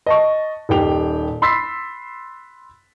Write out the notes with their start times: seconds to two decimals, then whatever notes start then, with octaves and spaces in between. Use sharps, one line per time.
0.06 D#5 A5 C#6
0.69 D#1 D#3 G4 G5 F7
1.42 B5 C6 E6 A6 B6 C7